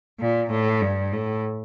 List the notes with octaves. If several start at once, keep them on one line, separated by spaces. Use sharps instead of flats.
A#2
A2
G2
A2